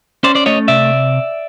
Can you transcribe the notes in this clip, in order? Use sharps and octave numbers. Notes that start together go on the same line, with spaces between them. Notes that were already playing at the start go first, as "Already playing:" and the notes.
C#4 C5 D5
C5 D5
A3 C#5 D#5
C3 D5 E5